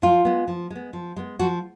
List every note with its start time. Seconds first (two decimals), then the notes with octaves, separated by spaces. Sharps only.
0.02 F3 F4
0.25 G#3 B3
0.48 F3
0.70 G#3 B3
0.93 F3
1.16 G#3 B3
1.39 F3 F#4